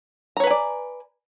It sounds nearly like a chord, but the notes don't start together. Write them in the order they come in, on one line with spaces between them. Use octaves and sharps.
A#5 C#5 B4 G#5 D5